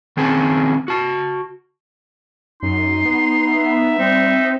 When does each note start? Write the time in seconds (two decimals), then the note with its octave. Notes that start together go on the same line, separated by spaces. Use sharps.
0.17 D#3 C4 C#4 G#4 B4 A5
0.88 F#4 A5
2.63 F#2 D#4 C6
3.05 B3
3.47 E5
3.99 G3 C4 D#4